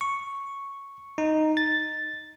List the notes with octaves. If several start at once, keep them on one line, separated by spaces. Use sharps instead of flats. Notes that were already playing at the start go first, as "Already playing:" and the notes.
C#6
D#4
A6